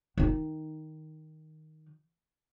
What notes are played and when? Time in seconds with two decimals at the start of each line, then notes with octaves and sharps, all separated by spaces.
0.18 D#3 D#4